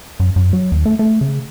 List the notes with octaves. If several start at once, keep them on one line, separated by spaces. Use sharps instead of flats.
F#2
F#2
F#3
D#2
A3
A3
C#3